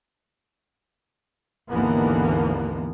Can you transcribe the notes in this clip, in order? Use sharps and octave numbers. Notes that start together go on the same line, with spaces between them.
G#1 D#2 D3 E3 A#3 B3